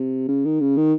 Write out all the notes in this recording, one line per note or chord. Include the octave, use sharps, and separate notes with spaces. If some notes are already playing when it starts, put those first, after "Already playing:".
Already playing: C3
C#3
D#3
C#3
D#3